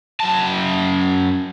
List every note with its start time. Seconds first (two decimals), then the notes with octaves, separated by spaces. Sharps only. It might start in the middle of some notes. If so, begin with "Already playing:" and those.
0.21 F#2 A5